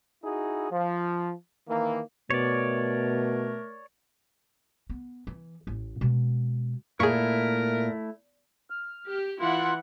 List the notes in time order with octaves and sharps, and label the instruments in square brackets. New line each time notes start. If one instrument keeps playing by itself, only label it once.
[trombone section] D#4 E4 F#4 G#4
F3
D#3 E3 A#3
[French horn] B2 [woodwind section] A3 A#4 [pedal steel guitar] C#5 D5
[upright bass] B3
E3
A1 A2
B2 G#3
[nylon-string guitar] A#2 [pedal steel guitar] A3 E4 [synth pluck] G#4 C#6 [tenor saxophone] A#4
[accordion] F6
[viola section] G4
[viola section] E3 E4 F#5 [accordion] F4